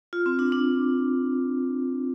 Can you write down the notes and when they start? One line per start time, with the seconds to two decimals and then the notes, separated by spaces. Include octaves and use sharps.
0.13 F4
0.26 C4
0.39 D4
0.52 D4